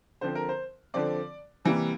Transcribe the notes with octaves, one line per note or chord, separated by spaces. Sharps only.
D3 F3 C4 C5
A#4
C5
D3 F3 C4 D5
C3 E3 G3 A#3